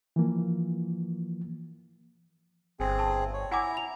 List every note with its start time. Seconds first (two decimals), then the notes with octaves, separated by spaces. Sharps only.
0.16 E3 F3 A#3
2.80 G1 C4 G#4
2.99 A5
3.33 C#5
3.51 E4 F#5 G#5 A#5 D6
3.77 F7